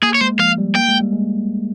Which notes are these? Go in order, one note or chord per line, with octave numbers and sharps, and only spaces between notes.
A#3 G#4
C#5
G#3 C5
F3 F5
G3
A#3 G5
G#3
G3
G#3